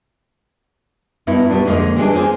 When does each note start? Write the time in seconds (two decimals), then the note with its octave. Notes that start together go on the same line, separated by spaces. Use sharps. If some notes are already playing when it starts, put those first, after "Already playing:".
1.27 G2 B3 D#4 E4
1.50 B2 G3 B3 D4
1.66 F2 D3 G#3 A#3 D#5
1.96 E3 G3 G#3 C4 D4 D#5
2.13 A#3 G#4 C5 G#5